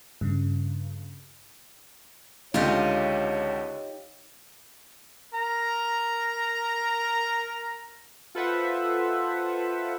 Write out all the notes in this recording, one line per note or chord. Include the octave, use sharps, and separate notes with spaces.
G2 C#3
C#2 D3 D#4 F4 G4 C#5 D#5 G6
A#4 A#5
F4 A4 B4 C5 E5 F#5